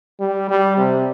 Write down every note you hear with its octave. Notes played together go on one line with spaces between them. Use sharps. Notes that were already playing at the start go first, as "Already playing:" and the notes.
G3
G3
C3